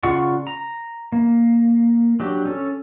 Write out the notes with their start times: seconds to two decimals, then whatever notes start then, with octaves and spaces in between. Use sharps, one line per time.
0.03 C#3 F4 D5 F#5 C#6
0.47 A#5
1.12 A#3
2.20 F#3 D4 G4
2.45 C#4 A4